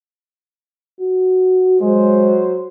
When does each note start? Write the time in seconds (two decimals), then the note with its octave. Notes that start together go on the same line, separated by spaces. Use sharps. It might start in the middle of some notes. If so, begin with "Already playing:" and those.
0.99 F#4
1.80 F#3 G#3 C5